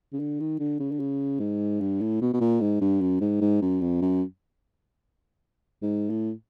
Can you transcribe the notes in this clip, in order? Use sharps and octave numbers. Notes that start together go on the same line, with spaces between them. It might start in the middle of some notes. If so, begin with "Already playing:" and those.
C#3
D3
D#3
D3
C#3
D3
C#3
G#2
G2
A2
B2
B2
A#2
G#2
G2
F#2
G#2
G#2
F#2
F2
F#2
G#2
A2